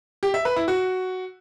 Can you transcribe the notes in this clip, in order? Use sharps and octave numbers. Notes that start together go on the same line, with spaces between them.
G4
E5
B4
E4
F#4